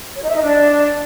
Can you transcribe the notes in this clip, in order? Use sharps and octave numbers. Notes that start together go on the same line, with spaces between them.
C#5
D#4
E5
D#4
D4